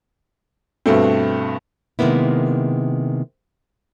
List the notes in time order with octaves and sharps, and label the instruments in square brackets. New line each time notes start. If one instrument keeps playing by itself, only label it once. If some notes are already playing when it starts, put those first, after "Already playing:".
[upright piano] G2 B2 A3 C4
[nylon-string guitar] C3 D#3 G#3 A#3 B3 E4